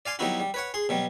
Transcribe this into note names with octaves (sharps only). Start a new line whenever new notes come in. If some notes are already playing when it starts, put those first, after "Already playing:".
D5 F5 G#5 C6
F#3 G3 B3 D#4 E4 F#4
G3
B4 C#5 F#5
G#4 C6
B2 F#3 G3